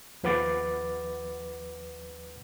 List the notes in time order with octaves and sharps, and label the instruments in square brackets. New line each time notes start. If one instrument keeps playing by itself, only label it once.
[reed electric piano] D#2 F3 B4 F#5 D6 A6